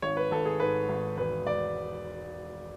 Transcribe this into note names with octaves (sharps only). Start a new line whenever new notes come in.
G#1 C#5
B4
G#1 A4
G#4
G#2 B4
G#1
E1 B4
E1 D5